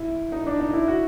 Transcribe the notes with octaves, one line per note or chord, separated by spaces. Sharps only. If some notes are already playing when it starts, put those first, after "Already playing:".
Already playing: E4
D#4
D4
D#4
E4
F#4